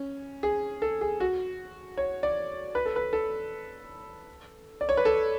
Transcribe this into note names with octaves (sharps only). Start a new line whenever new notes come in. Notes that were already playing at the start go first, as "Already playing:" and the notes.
Already playing: C#4
G#4
A4
G#4
F#4
C#5
D5
B4
A4
B4
A4
D5
C#5
B4
A4